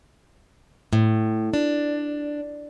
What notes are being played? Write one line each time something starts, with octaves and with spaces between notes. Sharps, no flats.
A2
D4